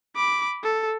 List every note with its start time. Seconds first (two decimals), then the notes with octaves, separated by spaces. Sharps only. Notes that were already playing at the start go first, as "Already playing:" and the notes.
0.16 B5 D6
0.63 A4